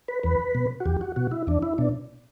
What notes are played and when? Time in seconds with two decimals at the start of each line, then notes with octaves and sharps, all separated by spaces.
0.08 B4
0.23 E2 B4
0.55 B2
0.80 F#4
0.86 E2 G4
1.01 F#4
1.16 B2 F#4
1.31 E4
1.47 E2 D4
1.63 E4
1.78 B2 D4